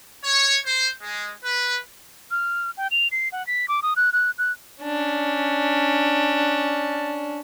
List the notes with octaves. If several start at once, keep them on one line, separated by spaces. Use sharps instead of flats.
C#5
C5
G#3
B4
F6
G5
F7
C7
F#5
B6
D6
D#6
F#6
F#6
F#6
C#4 D4